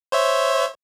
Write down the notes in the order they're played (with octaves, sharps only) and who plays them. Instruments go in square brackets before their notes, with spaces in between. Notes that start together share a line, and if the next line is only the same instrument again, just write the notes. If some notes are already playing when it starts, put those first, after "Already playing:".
[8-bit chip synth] C5 C#5 E5